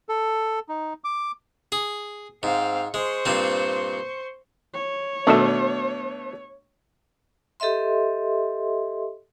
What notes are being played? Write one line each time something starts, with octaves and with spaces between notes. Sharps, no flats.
A4
D#4
D6
G#4
G#2 C4 F5
G#3 C5 C#6
G2 A#2 C4
C#5
B2 D#3 A3 D4 A4 E5
G4 A4 D#5 E5 C6